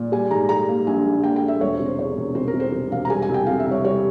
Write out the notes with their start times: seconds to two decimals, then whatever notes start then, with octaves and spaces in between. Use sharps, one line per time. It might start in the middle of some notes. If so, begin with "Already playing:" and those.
Already playing: A#2
0.12 G3 G#5
0.31 G#2 A#5
0.49 G3 A#5
0.69 A#3
0.87 A#1 G#5
1.05 A#1
1.23 A#3 G5
1.36 G5
1.43 A#3
1.48 E5
1.61 E1 C#5
1.74 C5
1.80 C3
1.86 C5
1.99 E2 C#5
2.17 E1
2.35 C3 C5
2.48 A#4
2.54 C3
2.60 C5
2.72 C3
2.91 E1 F5
3.05 A#5
3.10 G3 G#5
3.22 G#5
3.29 C2
3.34 G5
3.47 C3 F5
3.60 E5
3.66 C2
3.71 C#5
3.84 G3 C#5